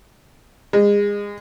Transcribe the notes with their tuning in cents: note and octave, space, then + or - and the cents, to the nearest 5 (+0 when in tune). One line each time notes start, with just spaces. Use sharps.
G#3 -30